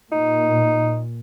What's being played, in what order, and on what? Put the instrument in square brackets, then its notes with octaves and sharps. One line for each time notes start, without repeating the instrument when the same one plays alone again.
[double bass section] A#2 [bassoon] D#4